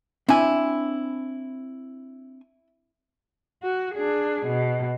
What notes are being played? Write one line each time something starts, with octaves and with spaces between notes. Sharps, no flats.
C4 D4 E4 G#5
F#4
D4 G#4
B2